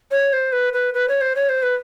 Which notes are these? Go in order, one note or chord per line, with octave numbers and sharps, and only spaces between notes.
C#5
C5
B4
B4
B4
C#5
C5
C#5
C5
B4